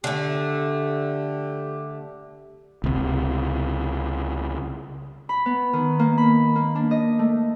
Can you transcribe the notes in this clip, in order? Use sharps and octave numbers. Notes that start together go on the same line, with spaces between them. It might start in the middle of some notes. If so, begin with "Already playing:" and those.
D3 A3 G4
C#2 C3
B5
B3
D#3
A#3
B5
A#3
D4
D#5
A3